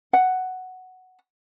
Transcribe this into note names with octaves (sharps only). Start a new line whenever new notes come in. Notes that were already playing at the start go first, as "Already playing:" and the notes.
F#5